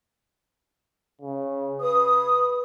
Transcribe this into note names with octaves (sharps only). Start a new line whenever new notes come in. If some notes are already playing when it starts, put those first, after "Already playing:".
C#3
B4 D#6